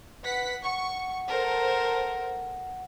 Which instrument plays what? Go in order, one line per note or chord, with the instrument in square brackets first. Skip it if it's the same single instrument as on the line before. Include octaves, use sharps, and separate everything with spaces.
[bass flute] B4 [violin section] F#5 B6
[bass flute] F#5 [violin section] C#6
[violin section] A4 A#4 C5